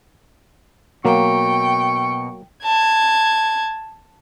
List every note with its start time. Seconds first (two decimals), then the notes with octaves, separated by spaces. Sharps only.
1.05 B2 F#3 A#3 G5 C#6
2.64 A5 G#6